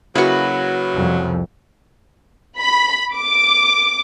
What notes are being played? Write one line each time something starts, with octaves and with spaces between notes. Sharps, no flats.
C#3 F#3 A#3 E4 F#4 B4
C2 F2
B5
D6